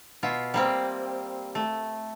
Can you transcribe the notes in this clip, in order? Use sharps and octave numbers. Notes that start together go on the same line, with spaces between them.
B2 F4 E5
G3 A#3 C4
A3